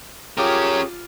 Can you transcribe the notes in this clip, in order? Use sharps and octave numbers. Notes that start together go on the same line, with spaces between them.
C#4 F4 G4 G#4 A#4 C#5 D6